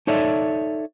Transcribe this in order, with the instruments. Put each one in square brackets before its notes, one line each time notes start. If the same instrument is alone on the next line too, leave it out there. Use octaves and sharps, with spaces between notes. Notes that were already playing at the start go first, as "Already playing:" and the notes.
[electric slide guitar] D#4 A4 C#5 D5 E5